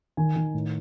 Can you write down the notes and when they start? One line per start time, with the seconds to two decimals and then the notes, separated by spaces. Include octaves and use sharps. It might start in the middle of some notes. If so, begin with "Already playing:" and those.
0.17 D#3 G#5
0.36 D#3
0.54 A2